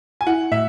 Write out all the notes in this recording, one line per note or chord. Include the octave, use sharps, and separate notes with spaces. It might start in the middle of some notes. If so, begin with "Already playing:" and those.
G#5
E4 F#5
A2 E5